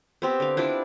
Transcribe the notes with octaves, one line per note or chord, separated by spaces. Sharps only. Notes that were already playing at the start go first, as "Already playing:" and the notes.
B3 C4 G4
D3 F5
D4 E4 F4 D5